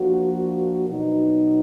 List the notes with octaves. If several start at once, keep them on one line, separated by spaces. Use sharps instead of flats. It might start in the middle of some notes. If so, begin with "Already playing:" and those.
Already playing: F3 A#3 D4 F#4
B2 F#3 B3 D#4